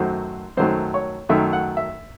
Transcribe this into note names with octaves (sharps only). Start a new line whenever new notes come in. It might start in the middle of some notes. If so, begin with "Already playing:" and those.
Already playing: F#2 D#3 F#3 A3 C5
F#2 D#3 F#3 A3 C5
C#5
F#2 D#3 F#3 A3 E5
F#5
E5